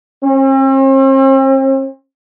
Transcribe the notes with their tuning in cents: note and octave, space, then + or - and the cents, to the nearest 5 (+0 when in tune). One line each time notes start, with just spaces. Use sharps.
C4 +45